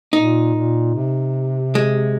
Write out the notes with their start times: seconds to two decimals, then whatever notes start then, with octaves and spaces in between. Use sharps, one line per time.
0.13 A#2 D#4
0.54 A#2
0.95 C3
1.75 G#3